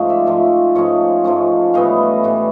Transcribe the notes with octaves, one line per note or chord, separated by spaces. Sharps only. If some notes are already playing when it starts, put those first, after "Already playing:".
Already playing: G#2 F3 A3 C#4
D5 E5
G#2 F3 A3 C#4
G#2 F3 A3 C#4 C#5 D#5
G#2 F3 A3 C#4
A2 E3 G3 B3 D#5 F5
A2 E3 G3 B3